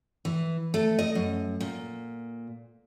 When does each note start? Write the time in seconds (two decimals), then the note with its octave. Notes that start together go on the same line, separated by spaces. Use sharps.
0.25 E3
0.74 A3
0.99 D#5
1.15 F#2
1.61 A#2